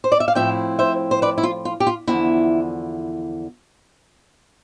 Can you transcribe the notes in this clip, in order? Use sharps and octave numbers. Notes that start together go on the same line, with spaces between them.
C5
D5
E5
F5
A2 F3 C4 E4 E5 G5
C5 E5
C5
B4 D5
E4
F4
F4
G4
F4
E2 D3 F3 E4